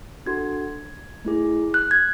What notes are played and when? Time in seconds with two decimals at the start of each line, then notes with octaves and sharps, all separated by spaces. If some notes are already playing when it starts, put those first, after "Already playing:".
0.26 D4 F#4 A4 G#6
1.25 A3 E4 G#4
1.74 F#6
1.91 G#6